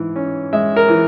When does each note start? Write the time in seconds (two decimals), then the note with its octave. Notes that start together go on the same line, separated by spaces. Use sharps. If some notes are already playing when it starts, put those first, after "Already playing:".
Already playing: G#2 E3
0.16 C#4
0.53 G#3 E5
0.76 A#4
0.88 E3